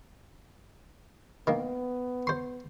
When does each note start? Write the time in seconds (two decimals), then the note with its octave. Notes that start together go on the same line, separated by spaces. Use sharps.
1.47 D#3 A#3 B3
2.27 C5 C6